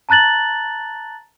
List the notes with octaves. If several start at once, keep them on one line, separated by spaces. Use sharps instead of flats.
A5 A#5 F#6 A6 F#7